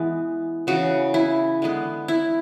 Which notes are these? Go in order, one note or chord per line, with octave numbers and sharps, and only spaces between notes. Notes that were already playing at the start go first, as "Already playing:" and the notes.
Already playing: E3 G#3 B3
C#3 E3 B3 F#4
E4
D3 G#3 B3
E4